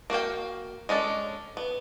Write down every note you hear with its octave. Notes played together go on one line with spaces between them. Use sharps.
A#3 F#4 F5 G5
G#3 C#4 D4 A4
B3